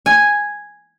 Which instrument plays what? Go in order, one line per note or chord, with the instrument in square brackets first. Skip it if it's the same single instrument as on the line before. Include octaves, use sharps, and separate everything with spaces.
[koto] G#5